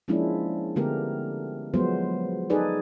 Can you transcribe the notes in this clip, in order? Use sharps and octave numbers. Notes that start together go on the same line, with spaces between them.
F3 G#3 A#3 C#4 D4 E4
D3 G#3 A3 B3 G4 A#4
F3 F#3 G#3 B3 C5
D#4 G#4 A4 B4 D5